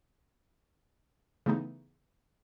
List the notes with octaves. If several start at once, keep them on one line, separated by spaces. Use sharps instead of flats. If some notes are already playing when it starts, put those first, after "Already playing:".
C#3 E3 A3 B3 D#4